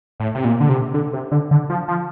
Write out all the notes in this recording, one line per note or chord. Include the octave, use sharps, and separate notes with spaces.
A2
C3
A#2
D3
C3
D3
C3
D3
D3
F3
F3